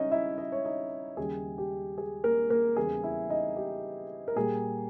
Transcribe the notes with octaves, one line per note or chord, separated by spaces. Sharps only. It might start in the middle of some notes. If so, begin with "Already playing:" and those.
Already playing: C#3 G3 C#4 D#4 E4 C#5 D#5
E4 E5
D#5
C#5
D#4 D#5
D#2 C#3 G3 G#4
G4
G#4
A#3 A#4
A#3 A#4
E2 C#3 G3 C#4 E4 G#4
E4 E5
D#4 D#5
G4
A#4
A#2 G3 A#3 G#4